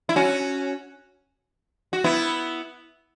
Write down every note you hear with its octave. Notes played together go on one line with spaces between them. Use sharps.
E4
C#4 F#4
F#4
B3 E4